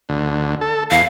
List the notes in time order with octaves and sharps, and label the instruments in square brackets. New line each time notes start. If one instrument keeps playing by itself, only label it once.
[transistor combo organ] D2
A4
[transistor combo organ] E2 [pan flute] F5